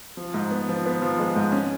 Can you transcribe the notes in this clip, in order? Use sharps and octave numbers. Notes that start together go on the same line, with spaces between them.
F3
G#2
B3
F3
B3
F3
G#3
G#2
C#4